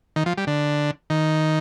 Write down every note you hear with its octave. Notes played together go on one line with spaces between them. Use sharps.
D#3
F3
G3
D3
D#3